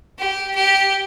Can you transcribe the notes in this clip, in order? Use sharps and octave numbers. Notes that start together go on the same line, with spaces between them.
G4
G4